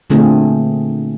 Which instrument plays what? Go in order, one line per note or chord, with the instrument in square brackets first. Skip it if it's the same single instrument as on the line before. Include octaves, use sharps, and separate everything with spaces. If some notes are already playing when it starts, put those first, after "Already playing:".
[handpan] A#2 D3 A3 C4 F4 G#4